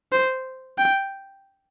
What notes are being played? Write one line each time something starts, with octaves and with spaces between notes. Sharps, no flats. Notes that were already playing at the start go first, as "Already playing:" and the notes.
C5
G5